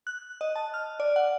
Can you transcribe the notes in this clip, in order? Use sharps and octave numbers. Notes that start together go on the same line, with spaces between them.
F#6
D#5
A5
F6
D5
F#5